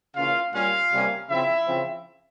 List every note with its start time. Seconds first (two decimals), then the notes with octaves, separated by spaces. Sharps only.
0.15 C#3 E3 A#3 C#4 F4 F5
0.53 A#2 G3 A#3 C#4 F4 F5
0.92 C3 G3 A#3 C#4
1.29 C#3 F3 C4 E4 E5
1.67 C#3 F3 C4